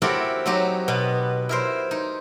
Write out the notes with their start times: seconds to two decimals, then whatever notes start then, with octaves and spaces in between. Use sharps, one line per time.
0.02 C4 E4 F#4 G4 A4 A#4
0.46 F#3 C4 D#4 F#4 G4
0.88 B2 B3
1.49 E4 A#4 C5
1.91 D#4